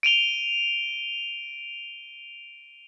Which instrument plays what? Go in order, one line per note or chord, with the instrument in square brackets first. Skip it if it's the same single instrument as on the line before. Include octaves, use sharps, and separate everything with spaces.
[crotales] D7 D#7 F7 G7